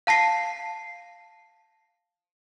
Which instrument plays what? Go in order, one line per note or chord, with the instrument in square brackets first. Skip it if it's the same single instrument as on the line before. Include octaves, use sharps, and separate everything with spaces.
[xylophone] F5 A5 A#6 C7